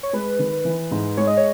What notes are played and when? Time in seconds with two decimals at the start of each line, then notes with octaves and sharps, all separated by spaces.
0.03 C#5
0.13 G#3 B4
0.39 D#3
0.65 E3
0.91 G#2
1.17 G#3 C#5
1.27 D#5
1.37 C#5